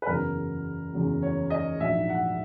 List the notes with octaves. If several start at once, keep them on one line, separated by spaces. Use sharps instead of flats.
B4
F#1 E2 C#3 F#3 A#4
F#1 E2 C#3 F#3
C#5
D#5
A#1 G#2 F#3 E5
F#5